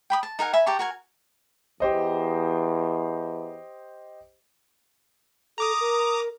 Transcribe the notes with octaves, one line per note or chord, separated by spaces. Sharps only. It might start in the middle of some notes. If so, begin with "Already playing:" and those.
G5 B5 D#6
A5
D#4 A#4 F#5 G#5
E5 G#5 B5
G4 A5 A#5 C#6
F#4 A#4 G#5
E2 G4 C5 D#5
A4 A#5 D6 D#6
A#4